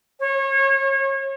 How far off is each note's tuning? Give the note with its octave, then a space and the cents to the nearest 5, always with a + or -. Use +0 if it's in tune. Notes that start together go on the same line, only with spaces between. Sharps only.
C#5 -30